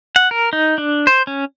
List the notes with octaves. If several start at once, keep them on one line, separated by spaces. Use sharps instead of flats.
F#5
A#4
D#4
D4
C5
C#4